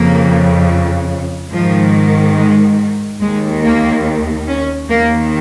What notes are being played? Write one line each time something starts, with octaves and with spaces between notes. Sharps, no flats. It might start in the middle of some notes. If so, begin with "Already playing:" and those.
Already playing: F2 C#3 A#3
G#2 D#3 F3
G#3
D#2 D#3 G#3
A#3
C#4
D#2 D#3 A#3